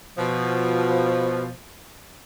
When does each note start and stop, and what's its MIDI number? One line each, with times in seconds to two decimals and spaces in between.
0.18 1.50 47
0.18 1.50 53